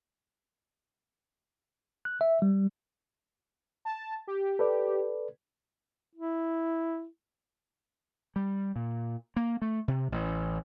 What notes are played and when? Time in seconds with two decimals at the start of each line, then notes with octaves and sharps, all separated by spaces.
2.05 F#6
2.21 E5
2.42 G3
3.85 A5
4.27 G4
4.59 A4 B4 D5
6.15 E4
8.36 G3
8.76 A#2
9.36 A#3
9.62 A3
9.88 C3
10.12 A1